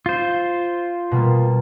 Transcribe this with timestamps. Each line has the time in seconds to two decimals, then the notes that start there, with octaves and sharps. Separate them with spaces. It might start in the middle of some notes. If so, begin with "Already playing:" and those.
0.06 F4 C5
1.11 B2 G3 A#3